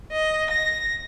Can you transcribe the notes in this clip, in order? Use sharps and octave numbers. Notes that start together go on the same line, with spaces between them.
D#5
A#6